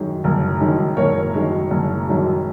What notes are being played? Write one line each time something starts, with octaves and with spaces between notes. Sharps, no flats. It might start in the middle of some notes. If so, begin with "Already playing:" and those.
Already playing: F#2 D#3 G#3
F#1
F#2 D#3 G#3
F#1 A#4 C#5
F#2 D#3 G#3
F#1
F#2 D#3 G#3